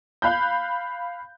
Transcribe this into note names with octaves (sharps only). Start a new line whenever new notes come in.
F5 B5 F#6 G6